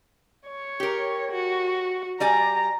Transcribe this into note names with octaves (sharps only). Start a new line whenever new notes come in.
C#5
G4 A#4
F#4
G3 D5 G#5 A#5